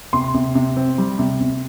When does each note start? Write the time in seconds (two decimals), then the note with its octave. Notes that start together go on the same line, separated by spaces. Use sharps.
0.13 C3 C6
0.34 C3
0.55 C3
0.77 C4
0.98 G3
1.19 C3
1.41 C3